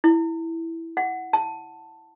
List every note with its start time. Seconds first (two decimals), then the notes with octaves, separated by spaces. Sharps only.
0.04 E4
0.97 F#5
1.33 A5